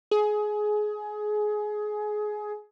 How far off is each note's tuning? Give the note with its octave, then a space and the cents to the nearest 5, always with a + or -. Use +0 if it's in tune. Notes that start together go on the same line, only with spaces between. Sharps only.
G#4 +20